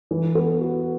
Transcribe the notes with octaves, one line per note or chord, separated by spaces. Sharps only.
E3
B3
F#4